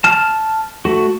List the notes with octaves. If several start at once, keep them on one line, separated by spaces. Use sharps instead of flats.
A5 F6
A3 F#4